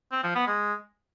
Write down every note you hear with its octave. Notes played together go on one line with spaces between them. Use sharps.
C4
F3
B3
G#3